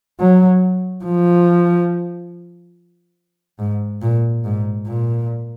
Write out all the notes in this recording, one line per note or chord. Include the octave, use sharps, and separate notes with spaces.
F#3
F3
G#2
A#2
G#2
A#2